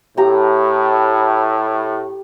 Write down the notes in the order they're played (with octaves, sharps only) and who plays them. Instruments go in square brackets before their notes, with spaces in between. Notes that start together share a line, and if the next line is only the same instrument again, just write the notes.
[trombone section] A2 [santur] G4 A#5